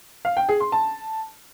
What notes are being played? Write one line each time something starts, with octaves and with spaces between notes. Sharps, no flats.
F5
G5
G#4
C6
A5